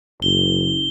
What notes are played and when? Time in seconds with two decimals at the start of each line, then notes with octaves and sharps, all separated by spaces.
0.22 F#1 G7